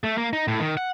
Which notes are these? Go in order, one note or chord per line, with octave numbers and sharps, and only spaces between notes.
A3
A#3
D#4
A2
D#3
F#5